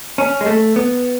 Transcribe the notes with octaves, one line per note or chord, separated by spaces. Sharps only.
C#4
G#3
A3
B3